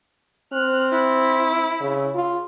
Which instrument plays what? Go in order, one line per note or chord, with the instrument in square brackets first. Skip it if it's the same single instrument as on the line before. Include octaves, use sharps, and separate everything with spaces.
[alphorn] C4 [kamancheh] F6 F#6
[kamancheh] E4
[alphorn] C#3
F4